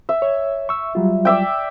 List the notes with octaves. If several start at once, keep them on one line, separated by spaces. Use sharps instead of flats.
E5
C#5
C#6 E6
F#3 G3 F4
D5 E5 G5